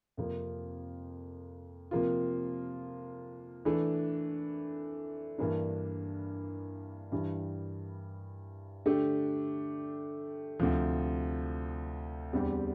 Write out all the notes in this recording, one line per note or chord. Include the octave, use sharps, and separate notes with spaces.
F2 C3 F3 A#3
C3 F3 A#3 F4
E3 A3 D4
G2 E3 A#3 D4
G2 E3 G3
D3 A3 D4 G4
D2 C3 F3
E2 D3 G3 C4 G4